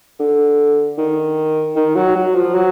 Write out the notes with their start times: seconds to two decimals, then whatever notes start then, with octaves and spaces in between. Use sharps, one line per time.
0.19 D3
0.97 D#3
1.76 D#3
1.96 F#3
2.15 F#3
2.35 F3
2.54 F#3